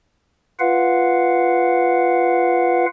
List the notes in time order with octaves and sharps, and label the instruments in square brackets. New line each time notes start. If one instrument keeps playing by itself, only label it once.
[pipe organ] F4 B4 F5 F#5